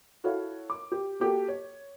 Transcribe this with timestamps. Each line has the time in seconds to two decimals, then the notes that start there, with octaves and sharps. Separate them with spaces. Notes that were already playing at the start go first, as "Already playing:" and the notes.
0.24 E4 F#4 A4 C#5 F5
0.70 D6
0.92 G4
1.20 A#3 F#4 G4 A4
1.48 C#5